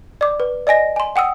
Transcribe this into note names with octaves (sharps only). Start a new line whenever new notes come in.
D5 D6
B4
D5 D#5 G#5 A#6
G#5 C6
F#5 G5 D#6 E6